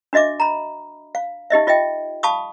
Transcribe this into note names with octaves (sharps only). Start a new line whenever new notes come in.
D4 F#4 D#5 E5 D6
A#5 B5
F5
D#4 G4 D#5 E5
F4 D#5 E5 G5
F5 A5 B5 C#6 D#6